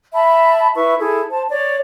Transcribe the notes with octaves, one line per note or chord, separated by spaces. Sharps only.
E5 A5 B5
E4 B4 E5 C#6
E4 G#4 A4
C5 A5
C#5 D5